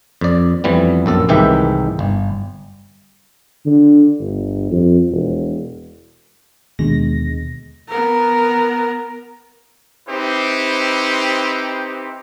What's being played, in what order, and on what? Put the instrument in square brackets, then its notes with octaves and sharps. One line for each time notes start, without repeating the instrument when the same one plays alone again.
[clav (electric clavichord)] F2 D5
F2 E3 G3 B3
A#1 F#2 A4
C2 G#2 D#3 E3 G4 E5
G1
[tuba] D3
G1
F2
E1
[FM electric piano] D#2 B2 D3 G#3 A#6
[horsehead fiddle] B3 A#4
[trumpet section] C4 D#4 E4 G4 B4 C5